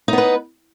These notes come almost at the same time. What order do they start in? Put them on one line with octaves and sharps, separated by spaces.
D#4 B3 B4